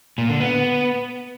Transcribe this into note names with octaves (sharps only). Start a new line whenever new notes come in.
A#2
D3
B3